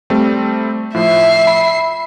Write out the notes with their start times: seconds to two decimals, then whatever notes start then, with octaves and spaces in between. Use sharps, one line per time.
0.10 G3 A3 C4
0.94 A2 F3 E5 C7
1.47 B5